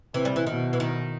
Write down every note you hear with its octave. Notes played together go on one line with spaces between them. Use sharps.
C3 E3
G3
E3
B2 D#3
E3
D#3